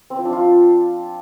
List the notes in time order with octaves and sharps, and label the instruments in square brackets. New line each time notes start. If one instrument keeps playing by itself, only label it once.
[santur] C4
F3
D4
F4